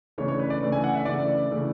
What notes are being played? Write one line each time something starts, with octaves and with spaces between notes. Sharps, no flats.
C#3 E3 A3 D4 C#5
C#5
B4
D5
C#3 E3 A3 D4
G#5
F#5
E5
C#3 E3 A3 D4 D5
C#3 E3 A3 D4